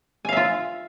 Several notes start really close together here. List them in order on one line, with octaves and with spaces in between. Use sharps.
G#5 F5 E5 F4